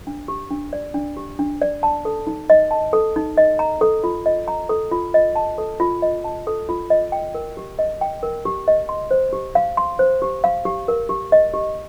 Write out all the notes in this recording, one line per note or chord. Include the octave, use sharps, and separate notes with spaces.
D4
G4
D4
D5
D4
G4
D4
D5
A5
A4
D#4
D#5
A5
A4
D#4
D#5
A#5
A4
F4
D#5
A#5
A4
F4
D#5
A5
A4
F4
D#5
A5
A4
F4
D#5
G5
A#4
G4
D#5
G5
A#4
G4
D#5
C6
C5
G4
F5
C6
C5
G4
F5
G4
A#4
G4
D#5
G4